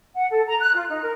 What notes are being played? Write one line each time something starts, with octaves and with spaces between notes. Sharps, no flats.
F#5
A4
A#5
F#6
F4
D#4
A#4